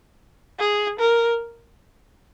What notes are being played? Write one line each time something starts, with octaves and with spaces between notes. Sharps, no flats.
G#4
A#4